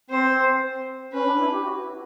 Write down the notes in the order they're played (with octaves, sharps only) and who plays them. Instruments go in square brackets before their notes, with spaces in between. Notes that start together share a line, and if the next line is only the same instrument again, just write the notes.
[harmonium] C4 [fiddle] C5
[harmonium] C#4 [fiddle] B4
[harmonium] D4
E4
G4
F#4
E4